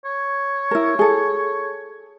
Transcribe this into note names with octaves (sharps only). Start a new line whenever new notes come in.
C#5
E4 A#4
G#4 A4